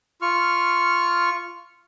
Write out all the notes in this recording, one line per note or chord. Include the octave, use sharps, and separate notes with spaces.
F4 C#6 F6